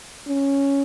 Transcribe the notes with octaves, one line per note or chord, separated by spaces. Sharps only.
C#4